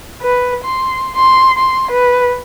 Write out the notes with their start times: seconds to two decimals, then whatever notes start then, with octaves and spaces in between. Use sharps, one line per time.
0.22 B4
0.64 C6
1.15 C6
1.58 C6
1.91 B4